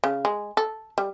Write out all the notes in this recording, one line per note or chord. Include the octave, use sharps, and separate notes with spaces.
C#3
G#3
A4
G3